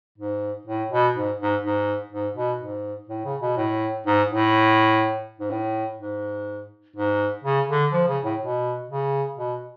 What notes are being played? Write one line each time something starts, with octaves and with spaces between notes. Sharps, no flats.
G#2
A2
B2
G#2
G#2
G#2
G#2
B2
G#2
A2
C#3
B2
A2
G#2
A2
G#2
A2
G#2
G#2
C#3
D3
F3
C#3
A2
B2
C#3
B2